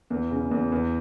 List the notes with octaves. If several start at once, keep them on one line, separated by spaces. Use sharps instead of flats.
E2
C#3
E2
E2